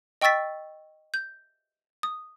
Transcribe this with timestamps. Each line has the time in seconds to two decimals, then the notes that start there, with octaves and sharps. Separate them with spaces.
0.21 D#5 G5 C#6 E6 A6 B6
1.14 G6
2.03 D#6